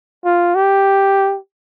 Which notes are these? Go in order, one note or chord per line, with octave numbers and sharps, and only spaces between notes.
F4
G4